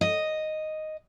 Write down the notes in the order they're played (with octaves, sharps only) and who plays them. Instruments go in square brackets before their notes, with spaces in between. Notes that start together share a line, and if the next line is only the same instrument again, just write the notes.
[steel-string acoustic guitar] D#5